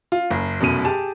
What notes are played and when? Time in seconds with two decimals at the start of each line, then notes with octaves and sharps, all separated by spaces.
0.12 F4
0.30 F#1
0.60 F1 F#2 B2 D#7
0.85 G4 G#4 A5